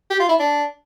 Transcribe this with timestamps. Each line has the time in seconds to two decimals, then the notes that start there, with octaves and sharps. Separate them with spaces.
0.10 G4
0.20 F4
0.29 E4
0.39 D4